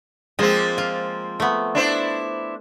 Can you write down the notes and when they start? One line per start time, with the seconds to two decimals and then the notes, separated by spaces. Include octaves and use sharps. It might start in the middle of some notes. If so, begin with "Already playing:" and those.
0.39 F3 G#3 A#3 C4
0.78 F4
1.40 A3 B3
1.75 D4 E4 C5